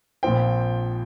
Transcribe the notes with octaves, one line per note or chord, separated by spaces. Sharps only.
A#1 A#2 F3 C4 G5